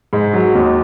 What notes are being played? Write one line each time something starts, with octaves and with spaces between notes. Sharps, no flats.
G#2
F#3
D#2